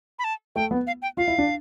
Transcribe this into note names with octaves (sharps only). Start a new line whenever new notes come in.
B5
A5
A3 G5
B3
F5
G5
F4 F5
E4
D4